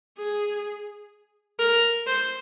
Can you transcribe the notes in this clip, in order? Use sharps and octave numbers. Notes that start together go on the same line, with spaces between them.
G#4
A#4
C5